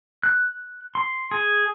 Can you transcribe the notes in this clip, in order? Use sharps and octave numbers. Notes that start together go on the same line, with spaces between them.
F#6
C6
G#4